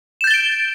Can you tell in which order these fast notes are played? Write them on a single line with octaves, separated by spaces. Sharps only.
E7 G6 A6 G7 D7